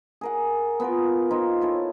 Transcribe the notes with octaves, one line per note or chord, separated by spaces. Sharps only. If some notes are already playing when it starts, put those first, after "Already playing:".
G#4 A#4 F#5
B3 F4 A#4
D#4 F4 C5
E4 A4 C#5